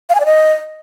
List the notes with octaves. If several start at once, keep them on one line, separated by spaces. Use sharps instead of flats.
F5
G#5
D5
D#5